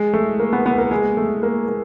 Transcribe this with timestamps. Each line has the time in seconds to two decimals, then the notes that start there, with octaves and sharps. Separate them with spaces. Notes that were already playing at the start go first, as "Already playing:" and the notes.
Already playing: G#3
0.13 A3
0.40 A#3
0.53 B3
0.66 B3
0.78 A#3
0.91 G#3
1.17 A3
1.43 A#3
1.68 A#3